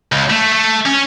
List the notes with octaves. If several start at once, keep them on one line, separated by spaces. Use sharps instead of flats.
C#2
A3
A3
C#4